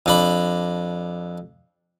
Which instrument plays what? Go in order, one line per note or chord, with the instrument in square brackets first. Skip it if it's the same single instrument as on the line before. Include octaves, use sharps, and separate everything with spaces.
[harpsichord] F2 D4 B5